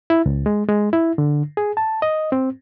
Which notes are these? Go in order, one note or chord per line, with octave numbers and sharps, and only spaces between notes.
E4
C#2
G#3
G#3
E4
D3
G#4
A5
D#5
C4